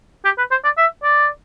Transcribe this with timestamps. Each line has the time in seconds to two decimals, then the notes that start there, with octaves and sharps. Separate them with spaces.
0.25 G4
0.38 B4
0.51 C5
0.64 D5
0.78 E5
1.03 D5